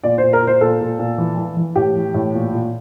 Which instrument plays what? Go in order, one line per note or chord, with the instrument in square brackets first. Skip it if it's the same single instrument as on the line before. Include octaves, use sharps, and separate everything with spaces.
[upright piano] A#2 D5
C5
A#2
A#4
A#2
C5
A#2 A4
A#2
A#2
E3
E3
E3
A2 G4
E3
A2
A#2
A#2